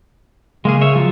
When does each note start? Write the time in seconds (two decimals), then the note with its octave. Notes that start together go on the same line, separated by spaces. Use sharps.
0.65 C#3 G#3 A#3 G#4
0.81 C#5 E5
0.95 F3 F#3 F4